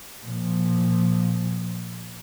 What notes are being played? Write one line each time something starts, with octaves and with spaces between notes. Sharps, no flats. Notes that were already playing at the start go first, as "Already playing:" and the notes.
A#2 F3